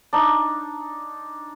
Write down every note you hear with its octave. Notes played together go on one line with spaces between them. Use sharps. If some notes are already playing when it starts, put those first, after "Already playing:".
D4 D#4